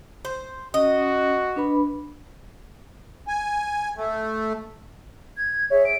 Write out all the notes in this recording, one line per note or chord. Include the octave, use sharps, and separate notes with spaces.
C5
C#4 F#4 D#5
D4 B4 B5
G#5
A3
G#6
G#4 C#5 E5
D7